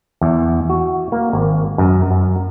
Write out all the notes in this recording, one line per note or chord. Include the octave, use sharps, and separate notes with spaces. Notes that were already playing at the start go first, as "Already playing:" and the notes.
E2
F#4
A#3
G#1
F#2
F#2